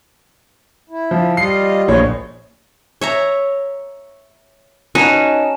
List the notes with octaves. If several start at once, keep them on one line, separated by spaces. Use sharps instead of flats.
E4
F3
G3 F4 D#5 C7
A#1 E2 B2 C#5 D#5
C#5 E5 A#5
C#4 D#4 F#4 B4 G#5 A5 E7